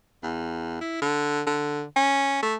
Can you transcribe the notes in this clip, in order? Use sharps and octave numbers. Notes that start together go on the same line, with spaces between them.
E2
E4
D3
D3
C#4
A3